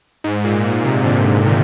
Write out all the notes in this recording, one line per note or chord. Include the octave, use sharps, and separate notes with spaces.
G#2
A#2
A#2
C3
D3
D#3